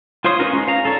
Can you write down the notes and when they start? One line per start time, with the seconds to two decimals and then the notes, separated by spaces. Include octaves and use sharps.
0.24 F4 C5 C#5 C6 D#6
0.39 C#4 D#4 F4 A#4 B4
0.53 G#3 C#4
0.67 F5 A#5
0.85 A4 C#5 D5